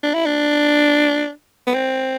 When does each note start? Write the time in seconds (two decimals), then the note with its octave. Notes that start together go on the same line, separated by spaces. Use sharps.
0.03 D4
0.14 E4
0.26 D4
1.67 B3
1.74 C4